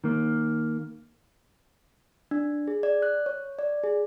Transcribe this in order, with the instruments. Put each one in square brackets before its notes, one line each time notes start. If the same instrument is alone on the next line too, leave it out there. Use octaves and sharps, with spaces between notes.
[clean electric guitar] D#3 A#3
[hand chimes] D4
G#4
D5
F#6
C#5
D5
G#4